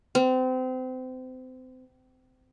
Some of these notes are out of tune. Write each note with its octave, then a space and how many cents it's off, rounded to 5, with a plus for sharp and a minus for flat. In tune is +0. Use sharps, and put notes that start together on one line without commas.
C4 -30